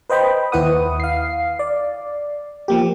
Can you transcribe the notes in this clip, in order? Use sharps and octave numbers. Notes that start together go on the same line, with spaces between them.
B4 C5 D#5 G5 B5
D#2 E4 B4 F#5 D#6
F5 C7
D5
F3 A#3 G4